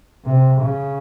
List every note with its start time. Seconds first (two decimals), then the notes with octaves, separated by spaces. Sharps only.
0.25 C3
0.61 C#3